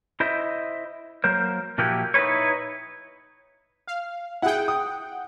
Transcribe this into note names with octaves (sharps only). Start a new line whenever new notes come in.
E4 C5 D#5 E5
F#3 A#3 A#4 C5
A#2 F3 A#3 E4 F#4 G4
D#4 E4 F#4 G#4 B4 C#5
F5
E4 G#4 F#5 G5
D#6